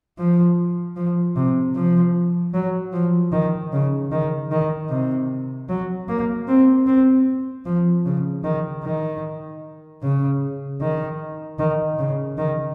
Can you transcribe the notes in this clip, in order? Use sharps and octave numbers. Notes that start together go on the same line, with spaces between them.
F3
F3
C3
F3
F#3
F3
D#3
C#3
D#3
D#3
C3
F#3
A#3
C4
C4
F3
C#3
D#3
D#3
C#3
D#3
D#3
C#3
D#3